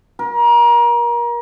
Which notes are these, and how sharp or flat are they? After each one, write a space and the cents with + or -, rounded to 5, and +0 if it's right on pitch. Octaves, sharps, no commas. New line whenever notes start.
A#4 +30